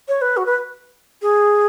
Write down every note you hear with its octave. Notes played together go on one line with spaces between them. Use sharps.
C#5
B4
F#4
B4
G#4